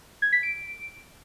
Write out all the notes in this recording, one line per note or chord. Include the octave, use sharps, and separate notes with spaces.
G#6
B6
D7